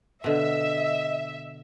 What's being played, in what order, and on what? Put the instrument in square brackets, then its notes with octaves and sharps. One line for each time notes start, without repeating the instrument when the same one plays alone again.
[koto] B2 D3 [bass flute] D#5 [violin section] E5